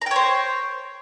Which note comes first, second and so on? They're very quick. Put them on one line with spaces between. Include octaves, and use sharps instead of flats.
A#5 G5 C#5 C5